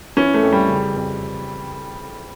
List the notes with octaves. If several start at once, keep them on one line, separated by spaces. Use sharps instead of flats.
E3 C#4
A3
F2
G3
C#3
F2